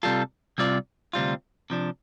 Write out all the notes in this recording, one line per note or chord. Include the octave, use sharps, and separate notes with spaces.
C3 G3 F4 A4
C3 G3 C4 F4 D5
D2 C3 G3 C4 F4
C3 F3 D4